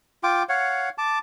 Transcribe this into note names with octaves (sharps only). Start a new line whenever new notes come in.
F4 G5 D6
C#5 F5 F#5
A5 D6